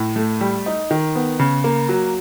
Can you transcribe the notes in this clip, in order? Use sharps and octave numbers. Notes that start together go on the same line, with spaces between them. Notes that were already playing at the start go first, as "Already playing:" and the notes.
Already playing: A2
A3
G3
D#4
D#3
B3
C#3
A#3
F#3